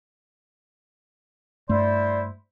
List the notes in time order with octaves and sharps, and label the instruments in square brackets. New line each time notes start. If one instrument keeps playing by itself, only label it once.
[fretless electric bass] G2 A3 [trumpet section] E4 C5 [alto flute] D5